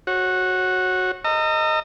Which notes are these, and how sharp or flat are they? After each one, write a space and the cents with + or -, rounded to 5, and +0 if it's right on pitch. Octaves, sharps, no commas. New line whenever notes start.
F#4 +0 C#5 -25
D#5 +0 A#5 -30 E6 +40